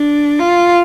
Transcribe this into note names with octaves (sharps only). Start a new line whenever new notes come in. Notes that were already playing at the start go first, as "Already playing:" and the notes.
Already playing: D4
F4